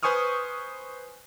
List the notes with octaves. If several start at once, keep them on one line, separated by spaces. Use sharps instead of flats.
B4 C5 G#5 C#6 D#6 F6